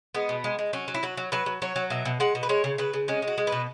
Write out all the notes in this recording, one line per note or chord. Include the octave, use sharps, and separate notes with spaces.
G#3 B3
B2
G#3
G#3
F#3 C#4
F#3
E4
F#3 F#4
F#3
F#3 B4
F#3
F#3 C#5
F#3
B2 E5
B2
G#3 F#5
B2
B4
G#3 C#5
C#3
C#3 B4
C#3
G#3 C#4
G#3
F#4
G#3
B4
B2